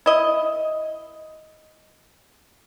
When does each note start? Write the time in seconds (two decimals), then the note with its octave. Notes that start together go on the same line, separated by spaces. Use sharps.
0.06 E4 D#5